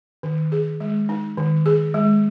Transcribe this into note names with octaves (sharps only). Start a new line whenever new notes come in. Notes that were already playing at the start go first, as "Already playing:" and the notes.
D#3
G#4
G#3
D#4
D#3
G#4
G#3